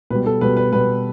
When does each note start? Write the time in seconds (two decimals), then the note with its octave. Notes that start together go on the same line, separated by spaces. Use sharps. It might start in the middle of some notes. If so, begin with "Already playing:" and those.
0.10 B2 G3 B4
0.26 A4
0.41 B2 G3 B4
0.57 B4
0.72 B2 G3 B4